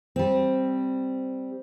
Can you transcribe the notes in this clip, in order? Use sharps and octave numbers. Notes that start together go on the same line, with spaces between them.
G3 C4